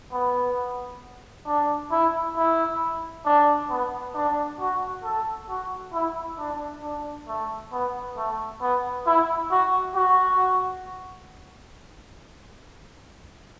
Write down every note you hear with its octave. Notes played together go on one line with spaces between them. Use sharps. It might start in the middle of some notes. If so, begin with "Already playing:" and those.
B3
D4
E4
E4
D4
B3
D4
F#4
A4
F#4
E4
D4
D4
A3
B3
A3
B3
E4
F#4
F#4